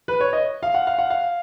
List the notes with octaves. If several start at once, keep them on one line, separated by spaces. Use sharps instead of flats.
B4
C#5
D#5
F5
F#5
F5
F#5
F5